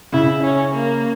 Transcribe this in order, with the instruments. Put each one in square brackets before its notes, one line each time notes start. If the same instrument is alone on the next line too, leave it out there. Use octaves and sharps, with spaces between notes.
[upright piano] C#3 [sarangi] E4
[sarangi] C#4
A#3